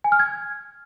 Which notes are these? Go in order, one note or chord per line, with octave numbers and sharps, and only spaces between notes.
G#5
F6
G#6